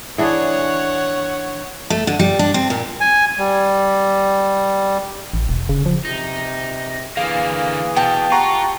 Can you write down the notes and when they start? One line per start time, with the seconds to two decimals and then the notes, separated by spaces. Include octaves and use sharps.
0.18 E3 D4 G#4 C#5 F#5
1.90 A3
2.07 D3
2.19 G3
2.39 D4
2.54 C4
2.70 A#2
3.00 G#5
3.38 G3
5.34 A1
5.49 E1
5.69 C#3
5.86 F3
6.05 C3 D#4
7.17 D3 E3 A#3 G#4 F5
7.96 B2 G5 A5
8.32 F4 G4 F#5 A#5 C#6